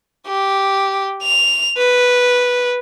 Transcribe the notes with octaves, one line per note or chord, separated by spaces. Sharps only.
G4
F7
B4